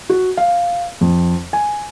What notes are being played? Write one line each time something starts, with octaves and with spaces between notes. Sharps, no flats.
F#4
F5
F2
G#5